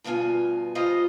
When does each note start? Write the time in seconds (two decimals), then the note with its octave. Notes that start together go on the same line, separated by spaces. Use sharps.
0.04 D2 G2 B2 F4 G#5
0.75 G3 F4 G#4 C5 D#5